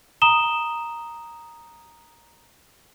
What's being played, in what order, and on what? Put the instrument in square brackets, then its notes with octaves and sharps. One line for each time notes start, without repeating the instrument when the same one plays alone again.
[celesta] A#5 D#6 E7 G7